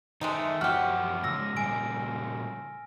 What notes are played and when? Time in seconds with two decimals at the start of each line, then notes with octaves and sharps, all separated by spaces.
0.21 D#3 G#3 A3 D#4 E5 G5
0.61 F#2 F3 F#4 G4 F#5 F6
1.24 G#2 C#3 G#3 E6 A#6
1.57 A#2 C#3 G3 G#5 D7